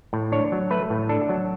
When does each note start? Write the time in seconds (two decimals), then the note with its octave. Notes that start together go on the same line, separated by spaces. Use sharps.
0.13 A2
0.32 D4 C#5
0.52 F#3
0.71 A3 B4
0.90 A2
1.09 D4 A4
1.29 F#3